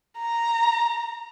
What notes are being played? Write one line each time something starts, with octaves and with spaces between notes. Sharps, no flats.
A#5